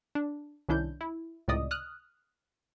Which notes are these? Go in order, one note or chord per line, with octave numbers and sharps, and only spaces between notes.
D4
C2 D#3 C#4 D4 E4 G6
E4
C#2 A2 C3 D5 D#5 D#6
D#6 F6 F#6